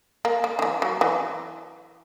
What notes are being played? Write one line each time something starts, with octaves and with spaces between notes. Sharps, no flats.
A#3
A#3
D#3
E3
F#3
E3